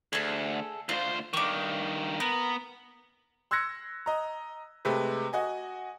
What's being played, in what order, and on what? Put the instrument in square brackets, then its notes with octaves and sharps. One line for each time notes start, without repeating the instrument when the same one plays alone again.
[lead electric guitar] D2 [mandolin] G#4 A4
[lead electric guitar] D2 C5 [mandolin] F4
[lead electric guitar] G2 D#3 [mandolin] C#6 D6
[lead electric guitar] B3 [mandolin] A#4
[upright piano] C6 E6 F#6 G#6 A#6 C#7
D#5 A#5
C3 G#3 A3 G4 B4
F#4 D#5 G#5